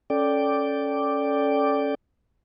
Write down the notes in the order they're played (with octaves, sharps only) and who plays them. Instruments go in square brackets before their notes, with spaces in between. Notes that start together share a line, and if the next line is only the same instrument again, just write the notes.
[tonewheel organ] C#4 A4 D5 G5 D6